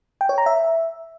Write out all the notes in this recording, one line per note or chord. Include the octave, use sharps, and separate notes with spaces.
G5
C#5
A#5
E5